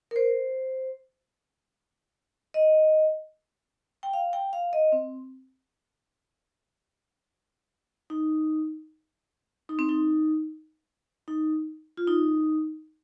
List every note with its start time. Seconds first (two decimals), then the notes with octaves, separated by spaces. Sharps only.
0.11 A#4
0.16 C5
2.54 D#5
4.03 G5
4.13 F5
4.33 G5
4.53 F5
4.73 D#5
4.92 C4
8.10 D#4
9.69 D#4
9.79 C4
9.89 D#4
11.28 D#4
11.97 F4
12.07 D#4